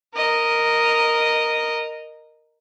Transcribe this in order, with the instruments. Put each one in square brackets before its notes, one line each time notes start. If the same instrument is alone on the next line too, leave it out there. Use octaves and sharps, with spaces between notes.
[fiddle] A#4 D#5